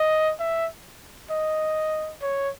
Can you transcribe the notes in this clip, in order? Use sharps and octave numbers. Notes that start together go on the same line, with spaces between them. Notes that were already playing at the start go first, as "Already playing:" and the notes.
Already playing: D#5
E5
D#5
C#5